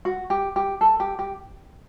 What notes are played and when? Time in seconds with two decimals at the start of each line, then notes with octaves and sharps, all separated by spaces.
0.05 F#4
0.30 G4
0.56 G4
0.81 A4
1.00 G4
1.19 G4